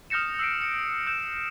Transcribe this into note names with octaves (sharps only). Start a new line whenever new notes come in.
D#6 F6 G6 A#6 C#7 E7
E6 C7 D7
C#7
E6 G6 E7